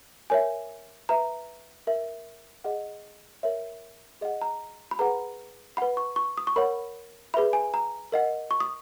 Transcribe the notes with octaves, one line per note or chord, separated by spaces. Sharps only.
A#4 C#5 E5 G#5
B4 E5 A#5
A#4 E5
G#4 D#5 F#5
A#4 C#5 E5
G#4 D#5 F#5
A#5
B5
G#4 B4 F#5 A#5
B4 F#5 B5
C#6
C#6
D#6
C#6
A#4 C#5 F#5 B5
G#4 B4 E5 B5
G#5
A#5
A#4 D#5 F#5
C#6
D#6